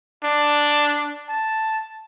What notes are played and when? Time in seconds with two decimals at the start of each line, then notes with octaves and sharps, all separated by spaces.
0.24 D4
1.29 A5